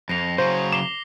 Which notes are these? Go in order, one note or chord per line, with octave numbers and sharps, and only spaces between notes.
F2 A#6 C7 F7
C#3 F#3 C5
D6 C7 E7 G7